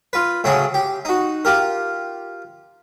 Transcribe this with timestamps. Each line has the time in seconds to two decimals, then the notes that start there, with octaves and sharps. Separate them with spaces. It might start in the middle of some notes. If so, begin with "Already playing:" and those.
0.13 F4 B4
0.44 A2 C#3 F#3 F#4 G#4
0.74 G4
1.05 D#4 F#4
1.45 F4 G4 A#4